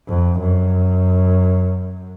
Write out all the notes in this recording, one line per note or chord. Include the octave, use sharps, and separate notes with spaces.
F2
F#2